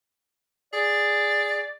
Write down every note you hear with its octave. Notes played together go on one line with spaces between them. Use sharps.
G#4 D5